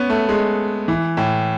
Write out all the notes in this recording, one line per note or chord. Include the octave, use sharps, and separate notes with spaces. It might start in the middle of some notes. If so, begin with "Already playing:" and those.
Already playing: B3 C#4
A3
G#3
E3
A2